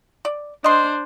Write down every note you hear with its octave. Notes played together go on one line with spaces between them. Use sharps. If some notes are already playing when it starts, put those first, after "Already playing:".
D5
D4 C5 D#5 C6